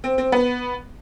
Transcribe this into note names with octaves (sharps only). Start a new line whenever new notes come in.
C4
C4
B3